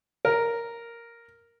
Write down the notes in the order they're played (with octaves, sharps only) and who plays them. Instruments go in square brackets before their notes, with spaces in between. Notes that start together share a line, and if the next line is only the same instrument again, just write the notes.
[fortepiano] A#4